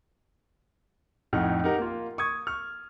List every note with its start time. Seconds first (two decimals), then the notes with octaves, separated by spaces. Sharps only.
1.33 F2 A2 D#4 F#5 F6
1.64 D#4 G4 A#4 F#5
1.78 A#3 F4
2.18 C#6 D#6 G#6
2.47 C#6 F6